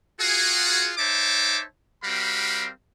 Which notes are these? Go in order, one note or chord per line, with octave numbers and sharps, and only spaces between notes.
F4 F#4 G#4
D#4 C5 C#5 E5 A5 D6
G3 C4 F#4 A#4 F5 B5